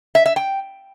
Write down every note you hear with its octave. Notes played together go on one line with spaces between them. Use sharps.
E5
E5
G5